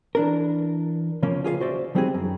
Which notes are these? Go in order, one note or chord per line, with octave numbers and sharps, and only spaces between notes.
E3 D4 A#4
C#3 F3 A#3 C#4
F4 G#4 C5 F5
F#4 C5 D5 E5
F3 G3 C4 D#4 F#4 G#4
F#2